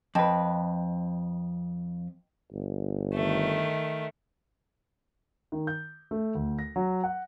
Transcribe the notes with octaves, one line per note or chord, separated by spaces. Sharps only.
F2 B4 D#5 G5 A5
G1
D#3 A3
D#3
G6
A3
D2
A#6
F#3
F#5